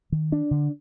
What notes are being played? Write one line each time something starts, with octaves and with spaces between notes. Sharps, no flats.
D#3
D4
D3